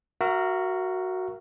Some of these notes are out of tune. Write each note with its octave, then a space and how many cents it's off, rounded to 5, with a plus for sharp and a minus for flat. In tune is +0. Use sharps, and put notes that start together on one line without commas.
F#4 +0 A#4 +0 E5 +40